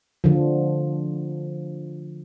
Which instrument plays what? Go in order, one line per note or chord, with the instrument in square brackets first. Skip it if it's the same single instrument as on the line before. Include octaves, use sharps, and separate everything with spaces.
[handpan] D3 F3